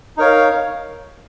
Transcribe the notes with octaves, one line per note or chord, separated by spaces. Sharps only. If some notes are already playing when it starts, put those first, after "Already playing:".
D#4 A#4 C#5 F5